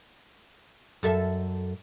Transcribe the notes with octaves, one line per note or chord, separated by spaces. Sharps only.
F#2 A4 E5